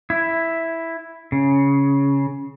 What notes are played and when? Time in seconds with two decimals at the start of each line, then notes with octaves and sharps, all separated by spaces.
0.10 E4
1.32 C#3